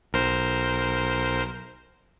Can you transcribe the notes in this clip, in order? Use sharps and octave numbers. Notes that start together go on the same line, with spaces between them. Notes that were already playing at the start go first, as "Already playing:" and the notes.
B1 A#4 C5